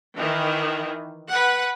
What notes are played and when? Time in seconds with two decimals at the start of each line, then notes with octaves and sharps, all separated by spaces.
0.16 D#3 E3
1.28 B4 F#5